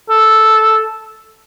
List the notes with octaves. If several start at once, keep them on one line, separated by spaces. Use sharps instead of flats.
A4